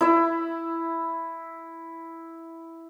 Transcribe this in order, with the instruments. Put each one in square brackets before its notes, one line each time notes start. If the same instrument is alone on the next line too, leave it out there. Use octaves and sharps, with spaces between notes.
[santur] E4 E5